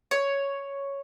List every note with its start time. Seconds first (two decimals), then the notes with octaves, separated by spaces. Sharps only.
0.11 C#5